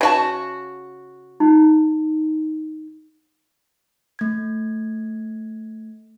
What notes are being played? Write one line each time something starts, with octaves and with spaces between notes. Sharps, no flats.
C#3 F#4 A5
D#4
A3 G#6